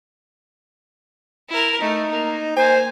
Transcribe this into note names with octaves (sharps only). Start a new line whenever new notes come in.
E4 A#4
A3 D#4
A#3
A#3 C5 G#5